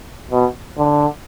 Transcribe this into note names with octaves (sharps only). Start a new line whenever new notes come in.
B2
D3